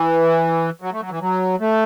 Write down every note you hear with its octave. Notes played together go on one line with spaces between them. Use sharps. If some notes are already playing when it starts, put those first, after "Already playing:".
Already playing: E3
F#3
A3
F#3
E3
F#3
A3